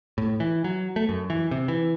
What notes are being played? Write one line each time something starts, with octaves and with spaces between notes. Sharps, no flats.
A2
E3
F#3
A3
F#2
E3
C3
E3